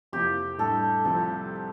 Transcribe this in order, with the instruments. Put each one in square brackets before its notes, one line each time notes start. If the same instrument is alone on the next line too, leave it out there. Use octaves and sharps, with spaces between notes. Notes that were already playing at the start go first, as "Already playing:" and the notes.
[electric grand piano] F2 C3 F3 A#3 E4 [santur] G4
[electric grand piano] A2 G3 D4 [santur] A4
[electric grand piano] C2 C3 F3 C4 [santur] A4